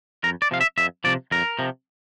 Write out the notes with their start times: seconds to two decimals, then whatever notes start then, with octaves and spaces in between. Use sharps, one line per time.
0.24 F2 A#4
0.42 D5
0.51 C3 F3 F5
0.61 E5
0.78 F2 E5
1.04 C3 F3 D5
1.32 F2 A#4
1.59 C3 F3